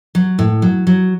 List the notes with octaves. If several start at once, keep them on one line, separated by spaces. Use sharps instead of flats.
F#3
A2
F#3
F#3